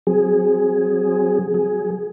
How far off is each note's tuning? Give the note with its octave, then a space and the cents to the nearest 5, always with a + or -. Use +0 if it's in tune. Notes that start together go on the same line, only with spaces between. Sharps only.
F#3 +0 C4 -5 G#4 +0
F#3 +0 G#4 +5